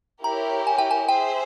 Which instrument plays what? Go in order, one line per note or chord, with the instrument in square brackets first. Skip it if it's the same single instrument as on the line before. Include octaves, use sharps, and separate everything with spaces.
[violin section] E4 G4 A#4 C#5 [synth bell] A#5
[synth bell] G#5
G5
G#5
[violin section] G#4 C5 E5 [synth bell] G5